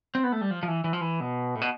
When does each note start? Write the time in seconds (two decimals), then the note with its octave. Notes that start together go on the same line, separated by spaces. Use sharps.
0.15 C4
0.24 B3
0.32 A3
0.41 G3
0.51 F3
0.63 F3
0.68 E3
0.84 E3
0.93 F3
1.01 E3
1.20 B2
1.55 A2
1.61 B2